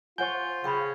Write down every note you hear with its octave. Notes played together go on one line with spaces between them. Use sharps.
F4 C5 F#5 G#5 C#6 G6
C#3 F5 G5 B5